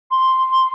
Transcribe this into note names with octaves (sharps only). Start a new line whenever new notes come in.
C6